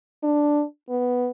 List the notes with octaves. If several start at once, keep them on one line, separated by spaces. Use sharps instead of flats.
D4
B3